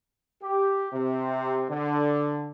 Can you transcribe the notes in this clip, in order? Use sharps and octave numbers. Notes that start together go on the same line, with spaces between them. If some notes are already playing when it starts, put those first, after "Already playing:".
G4
C3
D3